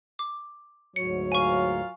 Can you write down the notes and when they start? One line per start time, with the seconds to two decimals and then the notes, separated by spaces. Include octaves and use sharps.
0.19 D6
0.96 D2 G#2 F#3 C#5 C#7
1.32 F4 A#4 F5 G#5 C#6